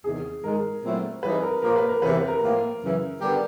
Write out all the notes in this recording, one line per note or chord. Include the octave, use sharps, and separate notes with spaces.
E2 C3 D#3 G#4
G#2 D#3 G#3 A#4
A#2 F#3 A3 C4 E4
E3 G3 C4 D#4 G#4 B4
A#4
A#2 F3 A#3 A#4
B4
A#4
E2 C3 E3 B4
B4
A#4
A2 F3 A#3
F#2 C#3 E3
D3 G3 B3 D4 G4 A#4